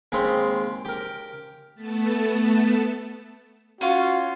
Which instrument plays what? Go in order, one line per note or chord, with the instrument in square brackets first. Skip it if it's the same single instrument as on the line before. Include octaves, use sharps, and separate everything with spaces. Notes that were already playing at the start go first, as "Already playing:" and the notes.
[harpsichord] D#2 G#3 C4 A#5 B5
G4 A#4
[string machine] A3 B3 A5
[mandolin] C#4 F4 [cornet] F#4